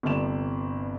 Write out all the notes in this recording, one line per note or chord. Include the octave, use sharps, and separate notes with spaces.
G1 G2 C3 D5 E7